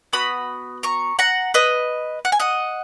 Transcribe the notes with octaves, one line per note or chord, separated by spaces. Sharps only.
B3 F#4 B5 D#6
A#5 C#6
F#5 A#5
B4 D#5
F#5
G#5
D#5 F#5